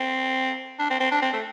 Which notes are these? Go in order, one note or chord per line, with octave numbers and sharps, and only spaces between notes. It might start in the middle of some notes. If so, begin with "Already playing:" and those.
Already playing: C4
D4
C4
C4
D4
C4
A3